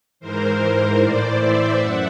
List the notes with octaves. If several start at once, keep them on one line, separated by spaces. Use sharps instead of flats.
G#2 E3 A#4 C5
A2 E3 C5 D5
D5 E5
F#2 E5 F#5